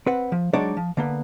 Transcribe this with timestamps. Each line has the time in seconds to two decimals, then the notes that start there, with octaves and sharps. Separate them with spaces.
0.06 C4 B4 F#5
0.32 F3
0.53 F#3 G#3 D4 D#4 C#5 D5
0.77 F3
0.97 D3 A#3 B3